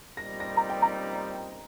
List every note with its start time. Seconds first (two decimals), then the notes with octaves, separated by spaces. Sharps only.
0.17 A#2 G3 C4 D#4 A#6
0.40 A#6
0.57 A#5
0.70 G5
0.82 A#5